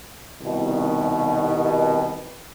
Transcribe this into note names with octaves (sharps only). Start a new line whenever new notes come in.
C2 B2 D#3